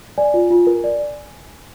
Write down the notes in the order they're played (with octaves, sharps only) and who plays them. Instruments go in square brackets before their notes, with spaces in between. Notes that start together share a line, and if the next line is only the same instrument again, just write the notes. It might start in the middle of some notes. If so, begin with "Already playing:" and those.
[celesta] D5 G#5
F4
F4
A#4
D5